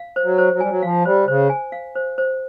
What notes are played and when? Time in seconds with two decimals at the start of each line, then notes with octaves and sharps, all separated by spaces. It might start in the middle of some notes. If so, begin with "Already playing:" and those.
Already playing: F5
0.16 C5
0.23 F#3
0.38 C5
0.53 F#3
0.60 G3 G#5
0.69 F#3
0.82 F3 F5
1.05 G3 C5
1.28 C#3 C5
1.50 G#5
1.72 F5
1.95 C5
2.18 C5